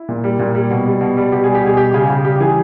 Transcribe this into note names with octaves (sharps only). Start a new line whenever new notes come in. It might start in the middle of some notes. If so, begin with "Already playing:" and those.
Already playing: E4
A#2
G3
A#2
G3
B2
G3
B2
G3
B2 G4
G3 G#4
G4
B2 G#4
G3 G4
C#3 G#4
C#3 G4
G3 G4
G4
E3 G#4